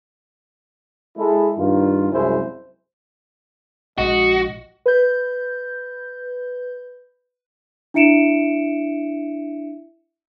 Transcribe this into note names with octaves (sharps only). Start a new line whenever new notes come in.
G#3 E4 A4
G2 D#3 F4
C2 F#2 C3 G#3 E4 C5
A#1 G#3 F#4 D#5
B4 G6
D4 E4 E5 C#7 D7 E7